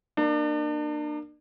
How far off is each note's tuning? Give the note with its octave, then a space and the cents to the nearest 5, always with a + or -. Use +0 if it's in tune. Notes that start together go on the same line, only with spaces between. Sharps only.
A#3 +0 D4 +35